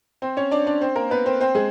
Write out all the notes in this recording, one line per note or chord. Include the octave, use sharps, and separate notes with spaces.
C4 C5
C#4 C#5
D4 D5
D4 D5
C4 C5
A#3 A#4
B3 B4
C4 C5
C4 C5
G#3 G#4